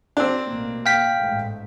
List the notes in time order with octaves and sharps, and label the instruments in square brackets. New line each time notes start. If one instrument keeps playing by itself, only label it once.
[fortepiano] C4 D4
[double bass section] A1 B2 A#3
[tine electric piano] F5 G5 B6
[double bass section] A1 G#2 A3